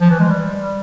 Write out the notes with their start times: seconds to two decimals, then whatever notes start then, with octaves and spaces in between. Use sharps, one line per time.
0.01 F3
0.10 E3
0.19 G#3
0.29 G3